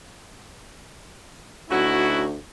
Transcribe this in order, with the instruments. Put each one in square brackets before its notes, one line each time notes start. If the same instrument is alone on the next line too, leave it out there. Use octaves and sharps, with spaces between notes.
[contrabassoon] D2 [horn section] C#4 D#4 F#4 [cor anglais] E4